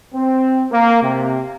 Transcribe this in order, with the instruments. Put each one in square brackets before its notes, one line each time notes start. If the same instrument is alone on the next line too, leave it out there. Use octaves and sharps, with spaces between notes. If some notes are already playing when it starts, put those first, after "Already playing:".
[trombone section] C4
A#3
C3